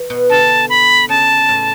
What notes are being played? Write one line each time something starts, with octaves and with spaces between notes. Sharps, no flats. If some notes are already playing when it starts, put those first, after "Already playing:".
Already playing: E3
B2
D3 A5
B5
C#3 A5
A2